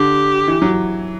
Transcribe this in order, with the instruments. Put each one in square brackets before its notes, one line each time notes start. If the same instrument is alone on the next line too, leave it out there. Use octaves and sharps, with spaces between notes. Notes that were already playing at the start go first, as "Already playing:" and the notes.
Already playing: [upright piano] D3 [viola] G4
[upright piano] E3
F#3